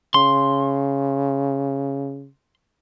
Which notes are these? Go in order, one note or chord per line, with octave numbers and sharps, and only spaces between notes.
C#3 C6